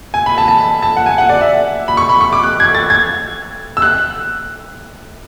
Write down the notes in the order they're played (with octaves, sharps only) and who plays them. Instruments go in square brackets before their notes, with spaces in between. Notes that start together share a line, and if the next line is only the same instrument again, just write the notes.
[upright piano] G#5
B5
A5
A5
B5
A5
F#5
G#5
F#5
D5
E5
B5
C#6
B5
C#6
D6
F#6
G#6
A6
G#6
E6
F#6